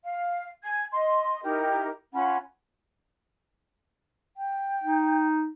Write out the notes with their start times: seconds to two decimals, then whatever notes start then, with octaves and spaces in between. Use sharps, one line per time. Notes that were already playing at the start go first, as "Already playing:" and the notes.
0.04 F5
0.64 G#5 G#6
0.92 D#5 C6
1.43 D#4 E4 G4 A#4
2.13 C#4 F4 F#5 B5
4.37 G5
4.84 D#4